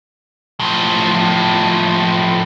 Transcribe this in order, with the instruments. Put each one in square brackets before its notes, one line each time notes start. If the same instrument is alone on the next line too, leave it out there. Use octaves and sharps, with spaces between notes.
[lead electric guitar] A2 F3